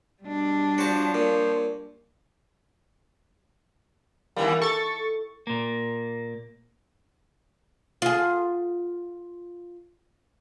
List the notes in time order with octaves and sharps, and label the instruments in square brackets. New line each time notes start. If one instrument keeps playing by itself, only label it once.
[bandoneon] B2 [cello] G3 D4
[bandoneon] F3 C5 C#5 [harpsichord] F#4 A5
[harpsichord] A#2
[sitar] D#2 E3 G3 [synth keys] A#3
[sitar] A4 [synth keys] C#6 A6
[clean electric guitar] A#2 A#3
[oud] F4 G#4